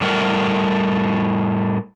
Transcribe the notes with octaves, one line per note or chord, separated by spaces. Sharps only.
A2 G3 A3 A#4 E5 F#5